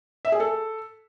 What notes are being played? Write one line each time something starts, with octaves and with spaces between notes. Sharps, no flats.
E5
G#4
A4